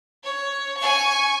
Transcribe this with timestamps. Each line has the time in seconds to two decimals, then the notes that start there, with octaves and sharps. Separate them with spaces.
0.24 C#5
0.78 G#5 C#6